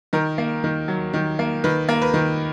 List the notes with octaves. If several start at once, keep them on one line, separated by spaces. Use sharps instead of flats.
D#3 A#4
A#3
D#3
F#3
D#3
A#3
D#3 B4
A#3
B4
D#3